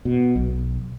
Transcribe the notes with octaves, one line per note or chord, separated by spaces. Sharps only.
B2
B1